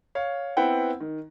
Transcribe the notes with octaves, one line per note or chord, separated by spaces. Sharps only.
C#5 F5
B3 C4 E4 B4 F#5 G5
D#3